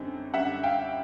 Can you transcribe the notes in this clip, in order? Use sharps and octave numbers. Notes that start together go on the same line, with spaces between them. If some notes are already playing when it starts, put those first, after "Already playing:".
Already playing: F#2 D3 G3 C4 D#4
F#2 D3 G3 E5 F#5
F5 G5